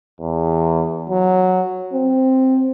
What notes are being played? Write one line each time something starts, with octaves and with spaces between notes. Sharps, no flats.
E2
F#3
C4